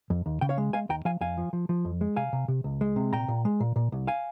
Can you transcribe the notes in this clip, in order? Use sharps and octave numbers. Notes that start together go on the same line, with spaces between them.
F2
D#2
C#3 G5
C#5 F5
G#3
G#3 F5 G#5
D#2 G5 A#5
F3 F5 G#5
F2 F5 G#5
F3
F3
F3
F2
G#3
C3 F5 G#5
C3
C3
C#2
G#3
C3
A#2 G5 A#5
A#2
G#3
A#2
A#2
C2
F5 G#5